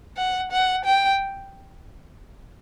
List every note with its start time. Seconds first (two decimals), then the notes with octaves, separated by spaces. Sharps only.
0.17 F#5
0.52 F#5
0.85 G5